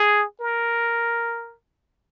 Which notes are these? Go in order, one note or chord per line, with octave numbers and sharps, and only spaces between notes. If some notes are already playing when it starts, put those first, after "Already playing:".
Already playing: G#4
A#4